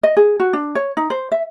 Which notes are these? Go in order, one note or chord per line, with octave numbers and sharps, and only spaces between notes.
D#5
G#4
F#4
D4
C#5
D#4
C5
E5